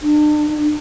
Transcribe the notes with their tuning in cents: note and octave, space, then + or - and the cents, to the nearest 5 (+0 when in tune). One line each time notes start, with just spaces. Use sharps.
D4 +35